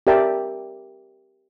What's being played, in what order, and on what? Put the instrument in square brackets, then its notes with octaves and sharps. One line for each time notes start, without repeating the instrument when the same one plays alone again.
[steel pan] G4 A#4 D5 E5 G5 A5